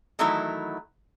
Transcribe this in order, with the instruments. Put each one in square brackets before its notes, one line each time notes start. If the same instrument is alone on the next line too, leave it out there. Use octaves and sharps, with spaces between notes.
[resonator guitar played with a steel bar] D#3 E3 F#3 A3 D#4 E4